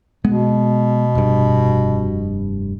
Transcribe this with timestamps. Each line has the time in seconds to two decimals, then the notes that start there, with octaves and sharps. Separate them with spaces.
0.25 B2 G#3 B3
1.15 F1 G2